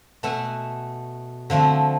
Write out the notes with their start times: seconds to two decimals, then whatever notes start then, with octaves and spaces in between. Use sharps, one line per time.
0.23 B2 A3 E5 F#5 G#5
1.50 D3 F3 A3 C4